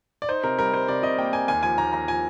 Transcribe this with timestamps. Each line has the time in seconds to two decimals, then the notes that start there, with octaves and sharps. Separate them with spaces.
0.22 D5
0.29 D#4 C5
0.44 C3 A#4
0.59 G3 A#4
0.73 G3 C5
0.88 C3 D5
1.03 C3 D#5
1.18 A#3 G5
1.33 A#3 G#5
1.48 D#2 G#5
1.63 F3 G#5
1.78 D#2 A#5
1.93 D#2 A#5
2.08 F3 G#5